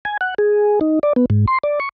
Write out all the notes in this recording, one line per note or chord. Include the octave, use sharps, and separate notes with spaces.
G#5
F#5
G#4
D#4
D5
B3
G#2
C6
D5
C#6